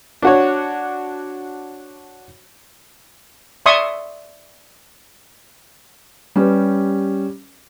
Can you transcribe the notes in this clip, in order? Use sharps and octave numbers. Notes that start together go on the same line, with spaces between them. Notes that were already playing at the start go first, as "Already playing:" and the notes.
D4 F#4 C#5
D5 E5 C6 C#6 D#6
G3 C#4 G4 B4